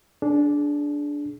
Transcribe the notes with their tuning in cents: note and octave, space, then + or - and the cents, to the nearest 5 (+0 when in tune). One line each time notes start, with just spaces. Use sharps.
D4 -10 G#4 +25